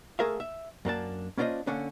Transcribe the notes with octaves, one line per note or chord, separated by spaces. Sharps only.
A3 G#4 A#4 E5 F5
E5
F#2 A#3 D4 A5
A#3 C#4 D4 F4 C5 D#5
D3 A#3 C#4 D4